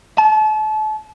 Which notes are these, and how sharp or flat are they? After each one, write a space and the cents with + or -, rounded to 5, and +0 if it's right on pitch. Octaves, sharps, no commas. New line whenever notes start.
A5 -35